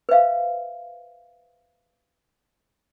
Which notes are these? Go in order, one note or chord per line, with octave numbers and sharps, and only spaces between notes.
B4 C5 E5 F5